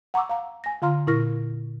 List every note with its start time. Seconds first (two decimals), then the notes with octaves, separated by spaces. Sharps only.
0.14 F#5 A#5 C#6 D6 E6
0.29 F5 A#5
0.64 G#5 A#6
0.82 D3 F4 F5 A#5 C6 F6
1.07 A#2 E4 A#4 C#6 F6 A#6